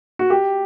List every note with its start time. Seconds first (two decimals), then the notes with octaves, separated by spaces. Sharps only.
0.19 F#4
0.30 G4